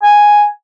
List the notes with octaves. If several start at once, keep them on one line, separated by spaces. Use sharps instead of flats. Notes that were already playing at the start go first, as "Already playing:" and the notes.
G#5